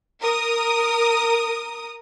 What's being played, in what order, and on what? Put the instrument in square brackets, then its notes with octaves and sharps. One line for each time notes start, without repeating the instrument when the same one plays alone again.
[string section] A#4 D#6